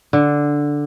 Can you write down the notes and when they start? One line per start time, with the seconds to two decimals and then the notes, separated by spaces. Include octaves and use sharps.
0.13 D3